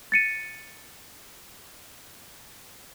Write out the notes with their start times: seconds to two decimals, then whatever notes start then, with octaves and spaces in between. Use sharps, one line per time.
0.12 A6 C#7 D#7